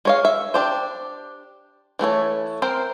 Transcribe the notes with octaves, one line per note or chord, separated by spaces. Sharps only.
G#3 C#5 F5
E5
D4 G4 C5
E3 A3 A4 C#5
C4 A#4 C5